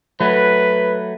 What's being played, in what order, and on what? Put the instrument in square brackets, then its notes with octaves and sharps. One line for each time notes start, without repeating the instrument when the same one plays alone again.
[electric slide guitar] F#3 A3 [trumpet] B4